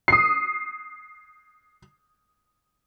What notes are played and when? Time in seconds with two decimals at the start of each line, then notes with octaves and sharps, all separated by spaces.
0.08 D#6 C7